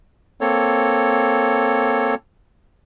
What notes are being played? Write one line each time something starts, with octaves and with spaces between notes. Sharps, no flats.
A#3 C4 A4 C#5